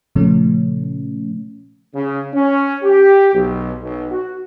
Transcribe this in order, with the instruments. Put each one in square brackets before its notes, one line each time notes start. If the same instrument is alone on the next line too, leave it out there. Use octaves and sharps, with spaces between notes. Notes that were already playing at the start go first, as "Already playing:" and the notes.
[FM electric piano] A#2 C#3 F3 A3 C#4
[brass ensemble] C#3
C#4
G4
B1
B1
F#4